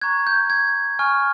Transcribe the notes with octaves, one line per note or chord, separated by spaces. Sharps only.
A#5 C#6 F#6 G#6
G6
G#6
G#5 C#6 F6